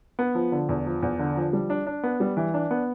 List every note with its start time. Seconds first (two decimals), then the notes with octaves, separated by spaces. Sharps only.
0.19 B3
0.35 F3
0.52 D3
0.69 E2
0.86 F3
1.02 E2
1.19 D3
1.37 F3
1.53 G3
1.70 D4
1.87 D4
2.03 B3
2.20 G3
2.37 E3
2.54 D4
2.71 B3